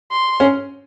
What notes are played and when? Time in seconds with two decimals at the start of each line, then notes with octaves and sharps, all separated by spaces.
0.11 C6
0.40 C#4